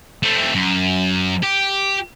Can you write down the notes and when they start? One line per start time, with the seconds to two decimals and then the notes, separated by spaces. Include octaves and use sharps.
0.23 A3 C4
0.55 F#2
1.43 G4